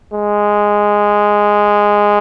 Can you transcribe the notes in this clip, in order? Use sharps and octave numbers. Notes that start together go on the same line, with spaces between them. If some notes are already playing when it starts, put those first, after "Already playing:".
G#3